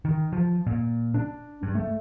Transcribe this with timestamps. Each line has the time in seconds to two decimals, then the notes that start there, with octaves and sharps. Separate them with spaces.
0.05 D#3
0.33 F3
0.67 A#2
1.14 D4
1.63 G2
1.75 A3